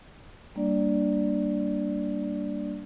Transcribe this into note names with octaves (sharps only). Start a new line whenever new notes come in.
G3 A#3 D4 D5